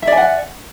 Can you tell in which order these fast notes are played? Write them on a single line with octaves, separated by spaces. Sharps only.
E5 D5 G#5 F#5